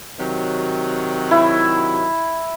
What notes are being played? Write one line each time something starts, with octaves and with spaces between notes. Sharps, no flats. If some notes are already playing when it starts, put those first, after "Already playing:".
C3 D#3 F#3
E4